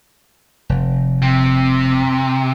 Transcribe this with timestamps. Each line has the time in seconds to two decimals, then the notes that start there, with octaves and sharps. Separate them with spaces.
0.69 F1
1.22 C3